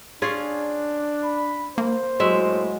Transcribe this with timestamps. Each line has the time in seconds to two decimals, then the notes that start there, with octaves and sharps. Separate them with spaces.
0.22 C#4 D4 F4 G#4
1.24 B5
1.78 A#3 C5
2.20 A2 F#3 G#3 E5